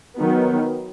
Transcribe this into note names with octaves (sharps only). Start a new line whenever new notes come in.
D#3 F#3 B3